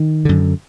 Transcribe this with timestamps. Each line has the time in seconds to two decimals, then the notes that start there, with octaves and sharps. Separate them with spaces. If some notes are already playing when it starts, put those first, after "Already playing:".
Already playing: D#3
0.25 F#2 D3